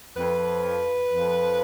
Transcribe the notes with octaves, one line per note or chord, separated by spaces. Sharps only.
F2 F3 B4
F2 F3